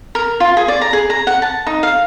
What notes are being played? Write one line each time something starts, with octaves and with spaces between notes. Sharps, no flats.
A#4
F4
G#4
D5
A#5
G#4
A#5
F#5
A5
D#4
F5